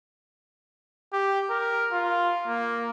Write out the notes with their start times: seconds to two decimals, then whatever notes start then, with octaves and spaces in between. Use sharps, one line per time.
1.13 G4
1.50 A#4
1.92 F4
2.46 A#3